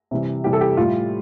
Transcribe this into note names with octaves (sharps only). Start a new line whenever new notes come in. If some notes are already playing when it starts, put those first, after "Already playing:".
C3 E3 G3
C3 E3 G3 G4
A4
G4
A2 G3 F4